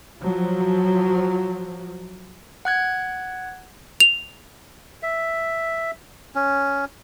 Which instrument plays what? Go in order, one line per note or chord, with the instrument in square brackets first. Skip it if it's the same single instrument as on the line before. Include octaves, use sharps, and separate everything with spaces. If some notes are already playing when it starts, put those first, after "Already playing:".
[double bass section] F3 F#3
[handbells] F#5 F#6 G#6
[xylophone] F7
[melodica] E5
C#4